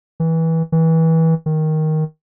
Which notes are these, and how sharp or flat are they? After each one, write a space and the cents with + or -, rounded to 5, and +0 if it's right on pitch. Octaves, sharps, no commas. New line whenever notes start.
E3 -20
E3 -25
D#3 +5